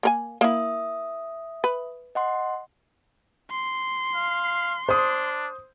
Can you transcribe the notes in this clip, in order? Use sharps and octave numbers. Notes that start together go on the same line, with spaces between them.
A#3 A#4 G#5
A#3 E4 E5 D#6
B4
D#5 F#5 C6
C6
F5
D4 C5 D#6